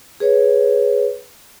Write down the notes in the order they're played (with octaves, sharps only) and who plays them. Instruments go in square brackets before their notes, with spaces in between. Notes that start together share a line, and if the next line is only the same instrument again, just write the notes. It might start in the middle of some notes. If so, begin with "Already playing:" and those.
[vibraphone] G#4 B4 C#5